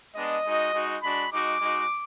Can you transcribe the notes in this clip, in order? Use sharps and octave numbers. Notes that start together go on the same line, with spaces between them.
G#3 B3 D4 D#5
G#3 D#4 F#4
G#3 D#4 F#4
G#3 D4 F#4 B5
G#3 D#4 F#4 D6
G#3 D#4 F#4